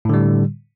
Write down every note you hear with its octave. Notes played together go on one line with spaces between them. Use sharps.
A2 D3 G3